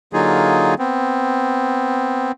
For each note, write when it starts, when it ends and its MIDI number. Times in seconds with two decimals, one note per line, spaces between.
0.13 0.74 50
0.13 0.74 54
0.13 0.74 58
0.13 0.74 63
0.13 0.74 65
0.13 0.74 68
0.79 2.32 59
0.79 2.32 60